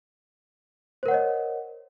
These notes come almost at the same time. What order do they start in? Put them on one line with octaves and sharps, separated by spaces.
C5 A#4 F#5 C#5 D#5